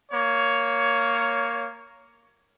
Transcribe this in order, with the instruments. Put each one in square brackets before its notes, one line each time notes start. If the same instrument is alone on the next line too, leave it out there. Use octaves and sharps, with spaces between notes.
[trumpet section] A#3 C#5